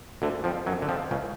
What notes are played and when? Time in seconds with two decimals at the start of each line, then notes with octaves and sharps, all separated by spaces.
0.22 D2 D3
0.44 F2 F3
0.66 F#2 F#3
0.82 D3
0.89 F2 F3
1.11 C#2 C#3